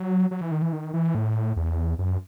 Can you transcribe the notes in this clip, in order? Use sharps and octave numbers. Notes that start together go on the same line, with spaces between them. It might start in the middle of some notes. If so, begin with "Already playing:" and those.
Already playing: F#3
F#3
E3
D#3
E3
D#3
E3
A2
E2
F#2